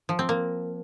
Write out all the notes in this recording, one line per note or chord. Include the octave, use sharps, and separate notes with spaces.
F3
C4
A#3